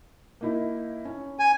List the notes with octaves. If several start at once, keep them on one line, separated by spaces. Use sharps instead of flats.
A#3 D#4 E4
C#4
G#5